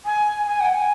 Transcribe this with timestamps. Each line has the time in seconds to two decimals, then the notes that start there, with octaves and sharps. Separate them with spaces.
0.06 G#5
0.47 G#5
0.60 F#5
0.73 G#5